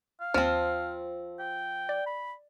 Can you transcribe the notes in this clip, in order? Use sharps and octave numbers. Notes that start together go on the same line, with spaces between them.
F5
D#2 F3 C4 A5 F6
G5
D5
B5